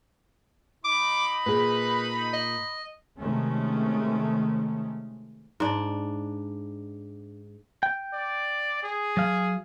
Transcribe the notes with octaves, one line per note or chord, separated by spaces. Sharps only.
D#4 B5 D6
A#2 G#4 B4
D#5
C3 D#3 G#3 A3 C#4
G#2 D4
G5
D5
G#4
F#3 F5